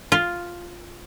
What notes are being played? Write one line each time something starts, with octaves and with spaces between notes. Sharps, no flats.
F4